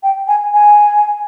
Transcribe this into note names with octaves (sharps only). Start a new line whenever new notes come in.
G5
G#5
G#5